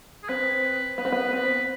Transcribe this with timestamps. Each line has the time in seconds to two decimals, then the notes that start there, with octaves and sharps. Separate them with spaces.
0.23 G#4
0.28 C4 B4
0.98 B3 B4
1.05 C4
1.12 B3
1.33 C4 B4